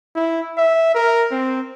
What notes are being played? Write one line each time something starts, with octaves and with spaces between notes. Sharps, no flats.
E4
E5
A#4
C4